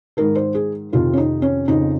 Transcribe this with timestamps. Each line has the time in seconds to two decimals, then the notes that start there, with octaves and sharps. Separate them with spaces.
0.17 G#2 D#3 A#4
0.35 C5
0.55 G#4
0.92 F2 C3 D#3 F4
1.13 C#4
1.17 D#4
1.42 C#4
1.68 F2 C#3 D#4